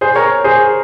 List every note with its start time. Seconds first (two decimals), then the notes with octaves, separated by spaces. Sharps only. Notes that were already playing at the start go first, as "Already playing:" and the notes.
0.01 G#4 C5
0.16 A#4 C#5
0.44 G#4 C5